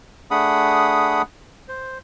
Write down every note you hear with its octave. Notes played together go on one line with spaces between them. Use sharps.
A3 D4 G#4 F#5 B5 D#6
C5